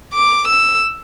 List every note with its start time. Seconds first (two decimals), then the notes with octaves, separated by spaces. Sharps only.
0.14 D6
0.48 E6